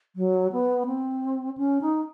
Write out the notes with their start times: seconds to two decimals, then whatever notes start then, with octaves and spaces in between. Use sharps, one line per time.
0.16 F#3
0.52 B3
0.86 C4
1.58 C#4
1.81 D#4